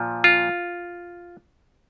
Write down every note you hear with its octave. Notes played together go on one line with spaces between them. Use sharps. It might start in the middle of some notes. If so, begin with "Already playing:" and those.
Already playing: A#2 F3
F4